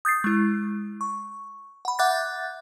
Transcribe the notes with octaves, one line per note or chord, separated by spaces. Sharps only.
D#6 G6 A6 C7
G#3 E4
C#6
F#5 B5
E5 F#5 D6 F#6 G6 A6